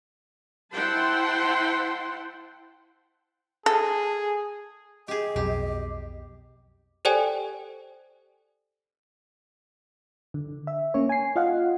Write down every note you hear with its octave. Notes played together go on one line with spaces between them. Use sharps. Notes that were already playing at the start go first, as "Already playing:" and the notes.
E4 C5 F#5 G5 A5 C6
G#4 A4
G4 G#4 D#5
B1 F2 B2 G4
G4 A4 C5 D5 G5 G#5
D3
E5
A#3 C#4 C#5
G#5 C7
F4 D#5 F5 F#5